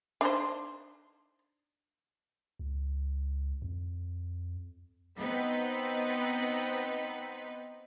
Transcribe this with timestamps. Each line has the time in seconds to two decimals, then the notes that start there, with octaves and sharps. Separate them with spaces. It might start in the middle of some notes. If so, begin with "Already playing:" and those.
0.21 D4 D#4 C5
2.59 C#2
3.62 F2
5.18 B3 C4 D#4 B4